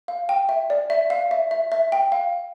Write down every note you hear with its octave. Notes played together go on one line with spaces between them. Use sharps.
F5
G5
E5
D5
E5
F5
E5
E5
E5
G5
F5